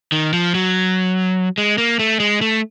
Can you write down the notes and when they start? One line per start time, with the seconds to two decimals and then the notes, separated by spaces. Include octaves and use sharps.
0.12 D#3
0.33 F3
0.55 F#3
1.58 G#3
1.78 A#3
1.99 A3
2.20 G#3
2.41 A3